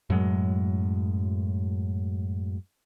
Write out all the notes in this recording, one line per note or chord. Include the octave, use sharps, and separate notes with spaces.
F#2 A2 F#3 G#3